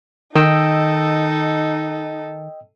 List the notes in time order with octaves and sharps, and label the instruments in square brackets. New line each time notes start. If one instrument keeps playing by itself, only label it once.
[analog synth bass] D#3 [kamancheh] D#4 A4 [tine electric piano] D#5 G5 E6